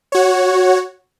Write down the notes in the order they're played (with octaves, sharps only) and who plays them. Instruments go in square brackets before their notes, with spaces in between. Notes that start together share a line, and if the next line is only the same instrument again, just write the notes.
[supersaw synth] F#4 C#5